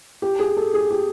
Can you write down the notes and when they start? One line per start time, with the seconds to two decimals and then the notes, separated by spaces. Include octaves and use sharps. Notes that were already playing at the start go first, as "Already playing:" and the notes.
0.22 G4
0.39 G#4
0.57 A4
0.74 G#4
0.91 G4